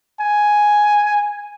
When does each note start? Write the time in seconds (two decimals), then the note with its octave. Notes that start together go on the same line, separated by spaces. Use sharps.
0.20 G#5